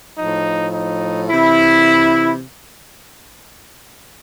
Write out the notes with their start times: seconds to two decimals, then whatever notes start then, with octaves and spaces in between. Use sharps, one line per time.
0.18 A2 F3 D#4
0.74 D#4
1.29 C3 E3 E4